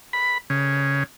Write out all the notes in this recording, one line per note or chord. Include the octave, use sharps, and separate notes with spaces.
B5
C#3